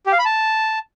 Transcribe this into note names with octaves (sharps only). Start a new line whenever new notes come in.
G4
F5
B5
A5